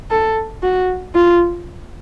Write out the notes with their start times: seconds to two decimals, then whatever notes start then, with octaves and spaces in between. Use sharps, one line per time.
0.11 A4
0.63 F#4
1.15 F4